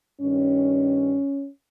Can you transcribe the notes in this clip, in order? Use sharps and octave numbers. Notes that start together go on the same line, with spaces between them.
G2 D#3 C#4